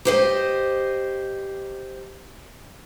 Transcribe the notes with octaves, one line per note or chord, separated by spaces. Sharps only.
G4 C5 D#5